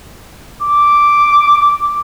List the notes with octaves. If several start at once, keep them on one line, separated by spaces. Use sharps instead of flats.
D6